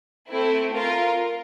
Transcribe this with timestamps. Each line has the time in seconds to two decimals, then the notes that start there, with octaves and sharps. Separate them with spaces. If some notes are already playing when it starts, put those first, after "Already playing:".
0.28 A3 C4 E4
0.74 F4 A#4